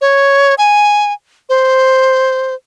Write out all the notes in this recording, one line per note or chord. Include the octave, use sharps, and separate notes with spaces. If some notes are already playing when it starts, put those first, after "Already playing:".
C#5
G#5
C5